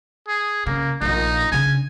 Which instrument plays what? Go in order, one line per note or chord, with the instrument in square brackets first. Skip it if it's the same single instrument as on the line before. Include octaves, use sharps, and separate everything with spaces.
[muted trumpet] G#4
[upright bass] C#3 [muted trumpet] A#3
[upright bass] A#1 A#2 [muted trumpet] D#4
[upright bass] C#3 D4 [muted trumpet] G#5